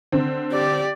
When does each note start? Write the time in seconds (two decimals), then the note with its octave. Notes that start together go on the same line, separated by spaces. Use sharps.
0.12 D3 C4
0.52 G4 D5